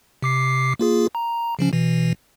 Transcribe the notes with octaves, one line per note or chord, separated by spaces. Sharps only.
C3 D6 C7
A#3 F4 G#4
A#5
C#3 F3 C#4
B2 E3